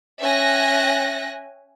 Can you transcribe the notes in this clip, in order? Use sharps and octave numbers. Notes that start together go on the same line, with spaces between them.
C#4 E5 G5 G#5 F#6 A#6